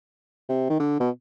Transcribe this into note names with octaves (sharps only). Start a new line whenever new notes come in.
C3
D#3
D3
B2